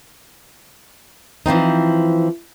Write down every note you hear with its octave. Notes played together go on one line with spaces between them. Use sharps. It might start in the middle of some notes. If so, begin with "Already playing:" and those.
E3 F3 C4 D#4